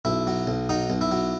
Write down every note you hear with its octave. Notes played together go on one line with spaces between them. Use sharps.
B1 E4
F#3
B1
F#3 D#4
B1
E4
F#3